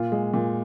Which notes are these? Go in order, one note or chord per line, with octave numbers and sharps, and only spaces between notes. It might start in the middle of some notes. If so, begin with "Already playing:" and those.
Already playing: A#2 F4
G#3
A#2